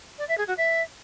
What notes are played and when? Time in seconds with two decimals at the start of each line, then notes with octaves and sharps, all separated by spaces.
0.18 D5
0.28 E5
0.37 G#4
0.47 F#4
0.57 E5